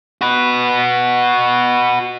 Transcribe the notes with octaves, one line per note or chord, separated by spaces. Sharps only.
F#4 B4